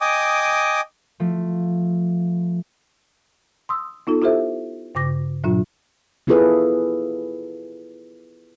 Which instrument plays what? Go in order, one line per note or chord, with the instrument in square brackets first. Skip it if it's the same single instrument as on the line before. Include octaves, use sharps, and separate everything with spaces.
[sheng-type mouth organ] D#5 G5 G#5 D6 D#6
[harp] F3 A3
[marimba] C6 D#6 E6
B3 D#4 F4 A4
E4 F4 G4 A4 C5 E5
G2 C#3 D6 A#6
G2 A#2 F#3 D4 F4
[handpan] B3 E4 F4 G#4 A4 B4